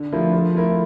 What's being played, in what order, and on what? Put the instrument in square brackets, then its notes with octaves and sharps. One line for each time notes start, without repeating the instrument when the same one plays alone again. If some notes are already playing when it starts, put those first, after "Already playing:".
Already playing: [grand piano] D3
F3 A3 E4 A#4
F3
A3 E4 A#4